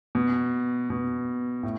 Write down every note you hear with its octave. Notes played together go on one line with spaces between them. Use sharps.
B2
B2
A2